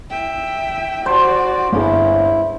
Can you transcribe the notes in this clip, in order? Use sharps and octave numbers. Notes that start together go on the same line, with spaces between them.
E5 G5
F#4 C5 D5
G1 C#4 D4 E4 G#4